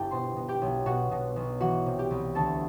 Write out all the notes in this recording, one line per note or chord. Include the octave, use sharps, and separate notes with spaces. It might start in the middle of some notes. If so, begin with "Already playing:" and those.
Already playing: G1 E4 G4 A4 G5 A5
B2 C5 C6
B2
G4 G5
B1
B2 F#4 F#5
B2
B1
E3 F#4 F#5
C3
G4 G5
C2
D2 A4 A5